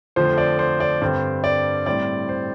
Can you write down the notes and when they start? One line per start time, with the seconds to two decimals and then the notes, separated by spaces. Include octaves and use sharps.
0.16 F2 D3 F3 A3 C5
0.38 D5
0.59 C5
0.80 D5
1.01 G2 D3 G3 C4 C5
1.44 D5
1.86 A2 G3 C4 D5
2.29 C5